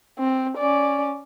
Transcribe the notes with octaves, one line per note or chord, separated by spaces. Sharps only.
C4
C#4 D5